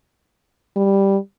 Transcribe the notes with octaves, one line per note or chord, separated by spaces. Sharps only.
G3